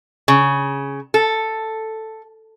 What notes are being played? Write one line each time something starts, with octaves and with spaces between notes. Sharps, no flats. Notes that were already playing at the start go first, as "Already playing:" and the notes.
C#3
A4